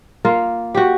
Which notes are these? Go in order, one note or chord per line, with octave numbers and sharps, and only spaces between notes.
A#3 F4
F#4 G4